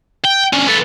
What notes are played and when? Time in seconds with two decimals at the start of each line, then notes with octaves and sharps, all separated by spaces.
0.24 G5
0.53 C#4 D4
0.67 B3 A4